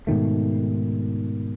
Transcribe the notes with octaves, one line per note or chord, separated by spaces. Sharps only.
G#2 B2 D#3 A3